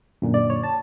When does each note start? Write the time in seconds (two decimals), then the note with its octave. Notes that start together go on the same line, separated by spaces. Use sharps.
0.22 F#2 A#2 D3
0.34 D5
0.50 C#5
0.63 A5